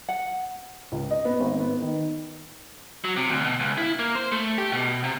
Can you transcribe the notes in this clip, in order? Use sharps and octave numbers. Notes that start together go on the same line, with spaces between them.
F#5
C#2
D#5
B3
G#1
B3
D#3
F#3
C3
D2
B2
C#2
E4
A#3
C5
A3
G4
B2
C3